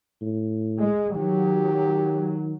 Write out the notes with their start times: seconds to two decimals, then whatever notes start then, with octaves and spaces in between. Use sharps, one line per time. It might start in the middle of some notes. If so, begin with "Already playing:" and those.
0.22 A2
0.79 G#3
1.16 D#3 F#3 G4